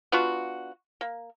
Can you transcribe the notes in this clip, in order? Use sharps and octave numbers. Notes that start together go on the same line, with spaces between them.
B3 D4 F4 F#4
A#3